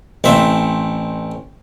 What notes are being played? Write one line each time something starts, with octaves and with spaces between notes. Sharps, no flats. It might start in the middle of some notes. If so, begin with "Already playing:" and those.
A1 C4 E5